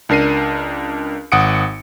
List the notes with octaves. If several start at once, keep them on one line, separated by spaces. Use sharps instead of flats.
C#2 D4 A#4 C7 D#7
G#1 F#5 D#6 C#7 D7